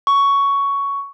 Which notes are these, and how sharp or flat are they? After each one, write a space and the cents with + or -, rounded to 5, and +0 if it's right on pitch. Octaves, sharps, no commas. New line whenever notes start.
C#6 +10